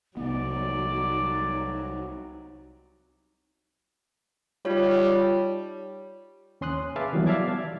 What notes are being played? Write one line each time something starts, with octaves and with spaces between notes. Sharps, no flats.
C2 F#3 B3 D#4 D5
G3 D#4 F4 C#5
D#2 C#4 C6 D#6 F#6
G#4 B4 E5 F5 A5 D6
D#3 E3 F#3 G3 B3
D5 E5 F5 A5 D6 G#6